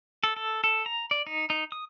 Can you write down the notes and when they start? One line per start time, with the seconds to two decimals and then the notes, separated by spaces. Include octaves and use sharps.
0.24 A4
0.36 A4
0.64 A4
0.86 A#5
1.11 D5
1.27 D#4
1.50 D#4
1.72 D#6